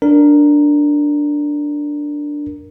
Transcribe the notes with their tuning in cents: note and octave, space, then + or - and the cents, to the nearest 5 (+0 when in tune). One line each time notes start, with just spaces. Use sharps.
D4 +0 A#4 +0